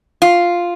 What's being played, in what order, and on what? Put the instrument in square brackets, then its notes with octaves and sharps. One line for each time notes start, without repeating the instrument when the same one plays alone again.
[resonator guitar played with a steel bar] F4